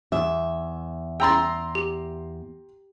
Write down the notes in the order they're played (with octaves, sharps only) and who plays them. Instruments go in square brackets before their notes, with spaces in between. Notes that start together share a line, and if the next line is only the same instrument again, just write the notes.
[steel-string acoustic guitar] E2 E5
[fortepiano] G5 A#5 C6 [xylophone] E6 A6
[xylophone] G4